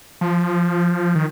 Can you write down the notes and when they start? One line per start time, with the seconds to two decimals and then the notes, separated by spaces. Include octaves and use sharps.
0.21 F3
1.15 D#3